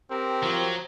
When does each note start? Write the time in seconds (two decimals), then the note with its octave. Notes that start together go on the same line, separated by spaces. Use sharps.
0.11 C4 G4 A#4
0.43 F3 F#3